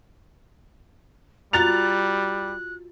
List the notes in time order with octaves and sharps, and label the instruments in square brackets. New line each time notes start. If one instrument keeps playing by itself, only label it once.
[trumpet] G3 [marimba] F4 F#4 A#5 [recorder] F#6 [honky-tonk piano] A6 F7